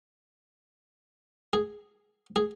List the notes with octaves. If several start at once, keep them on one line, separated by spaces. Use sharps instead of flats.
G#4
G#4